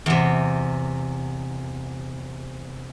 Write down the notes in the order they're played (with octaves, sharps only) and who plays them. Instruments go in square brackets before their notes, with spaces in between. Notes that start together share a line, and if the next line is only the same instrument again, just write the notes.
[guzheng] E2 C3